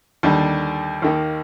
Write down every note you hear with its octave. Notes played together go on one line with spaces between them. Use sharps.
D#2 D3 G3
D#2 D#3 A#3